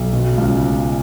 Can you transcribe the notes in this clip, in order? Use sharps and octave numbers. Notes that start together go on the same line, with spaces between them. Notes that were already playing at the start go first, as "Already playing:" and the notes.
Already playing: B1
B2
C#2